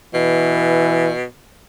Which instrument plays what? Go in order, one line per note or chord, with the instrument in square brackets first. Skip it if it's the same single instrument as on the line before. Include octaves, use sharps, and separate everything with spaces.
[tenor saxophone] B2 [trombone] E3